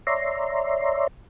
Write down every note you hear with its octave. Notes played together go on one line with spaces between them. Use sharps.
C#5 D5 E5 A#5 C6